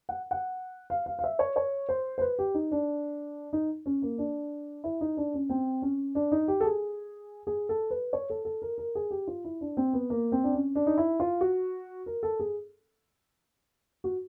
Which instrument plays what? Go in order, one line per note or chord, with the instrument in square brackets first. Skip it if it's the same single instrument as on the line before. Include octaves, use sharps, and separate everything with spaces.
[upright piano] F#5
F#5
F5
F5
F5
E5
C#5
C#5
C5
C5
B4
G4
D#4
D4
D#4
C#4
A#3
D4
E4
D#4
D4
C#4
C4
C#4
D4
D#4
G4
A4
G#4
G#4
A4
B4
C#5
A4
A4
A#4
A#4
G#4
G4
F4
E4
D4
C4
B3
A#3
C4
D4
C#4
D4
D#4
E4
F4
F#4
A#4
A4
G#4
F#4